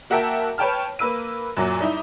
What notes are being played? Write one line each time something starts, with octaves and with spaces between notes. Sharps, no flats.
A#3 F#4 A#4 E5 G5 A5
B4 C#5 G5 A5 F6
A#3 B4 E6 D#7
F#2 A#2 F#3
G3 D#4 E4